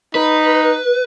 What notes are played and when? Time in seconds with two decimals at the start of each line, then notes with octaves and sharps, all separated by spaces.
0.15 D#4 B4